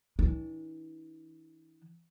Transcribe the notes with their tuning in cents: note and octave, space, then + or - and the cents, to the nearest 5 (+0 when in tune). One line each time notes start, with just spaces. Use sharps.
E3 -40 D4 -30